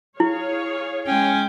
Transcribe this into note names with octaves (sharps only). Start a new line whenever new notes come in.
E4 G#4 C#5 F5
G#3 C#4 G5